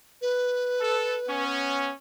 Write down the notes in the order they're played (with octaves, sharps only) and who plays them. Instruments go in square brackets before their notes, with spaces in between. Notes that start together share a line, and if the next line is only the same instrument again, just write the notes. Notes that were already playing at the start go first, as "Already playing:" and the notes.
[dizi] B4
[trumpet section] A4
B3 C#4